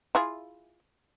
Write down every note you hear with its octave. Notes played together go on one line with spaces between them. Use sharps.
E4 F4 G#4